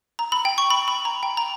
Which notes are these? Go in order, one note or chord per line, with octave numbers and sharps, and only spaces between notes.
A#5
B5
G5
C#6
B5
B5
A#5
G5
A#5